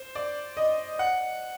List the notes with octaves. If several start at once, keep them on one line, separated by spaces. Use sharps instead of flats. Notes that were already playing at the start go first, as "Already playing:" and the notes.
Already playing: C5
D5
D#5
F#5